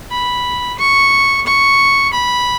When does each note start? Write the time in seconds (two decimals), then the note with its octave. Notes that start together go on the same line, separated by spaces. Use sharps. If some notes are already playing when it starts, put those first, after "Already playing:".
0.11 B5
0.79 C#6
1.46 C#6
2.13 B5